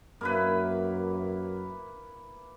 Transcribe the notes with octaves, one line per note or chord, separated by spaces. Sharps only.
F#2 A#3 E4 B4